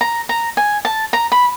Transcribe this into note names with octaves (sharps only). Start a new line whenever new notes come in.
A#5
A#5
G#5
A5
A#5
B5